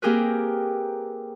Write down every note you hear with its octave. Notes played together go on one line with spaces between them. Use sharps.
A#3 C4 G4 G#4 A#4 B4